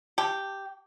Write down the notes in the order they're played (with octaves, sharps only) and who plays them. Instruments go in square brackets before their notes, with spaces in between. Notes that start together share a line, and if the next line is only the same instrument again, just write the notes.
[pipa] G4 [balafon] A5